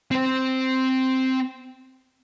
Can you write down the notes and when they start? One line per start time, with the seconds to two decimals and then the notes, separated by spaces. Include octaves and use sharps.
0.11 C4 C5